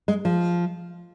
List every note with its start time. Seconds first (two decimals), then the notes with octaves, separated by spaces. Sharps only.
0.08 G#3
0.25 F3